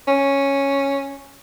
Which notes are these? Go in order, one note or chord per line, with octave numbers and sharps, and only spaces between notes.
C#4